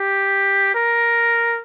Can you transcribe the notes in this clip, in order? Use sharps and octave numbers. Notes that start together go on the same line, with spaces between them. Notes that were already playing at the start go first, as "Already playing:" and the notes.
Already playing: G4
A#4